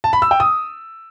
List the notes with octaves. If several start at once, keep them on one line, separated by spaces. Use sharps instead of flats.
A5
B5
E6
G5
D#6